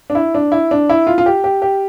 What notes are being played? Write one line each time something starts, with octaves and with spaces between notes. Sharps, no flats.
D4
E4
D4
E4
D4
E4
F4
F4
G4
G4
G4